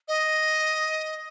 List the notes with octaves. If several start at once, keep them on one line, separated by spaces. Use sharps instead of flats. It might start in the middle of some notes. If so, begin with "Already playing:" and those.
D#5